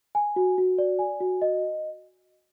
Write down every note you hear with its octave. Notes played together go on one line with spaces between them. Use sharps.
G#5
F#4
F#4
D5
G#5
F#4
D#5